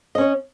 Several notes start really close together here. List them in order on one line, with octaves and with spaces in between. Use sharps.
D#5 C#4 C#5